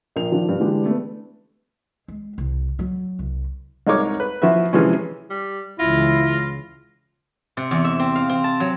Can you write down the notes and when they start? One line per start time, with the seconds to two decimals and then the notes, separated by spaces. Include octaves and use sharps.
0.16 A#1 A#4 F7
0.31 D#3 F3 D4
0.46 G2 C3
0.59 D3 E3 G3 G#3 D4 G4
0.85 A3 B3
2.08 G#3
2.38 C2
2.79 F#3
3.19 C2
3.87 C2 G#3 D#4 A#4 C#5 D6
4.20 B4
4.42 F3 E4 F#4 B4 E5
4.73 C3 E3 F3 G#3 C#4
5.30 G3
5.79 C#2 C#3 E3 E4 F4 A#6
7.57 C3
7.71 E2
7.85 E5
7.99 C4
8.15 F5
8.29 C4
8.44 A5
8.60 F#3